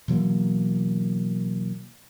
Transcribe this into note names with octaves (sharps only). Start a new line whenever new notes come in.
B2 E3 F#3 A#3